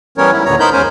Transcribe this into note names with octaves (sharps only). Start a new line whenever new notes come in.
E3 G3 B3 C#4 A#4 C#5
G#2 E4
D#2 A#2 D3 B3 C#5 A#5
B3 D#4 A#4 C5 B5 G6
E2 G#2 C#4 A#4 C5 G#5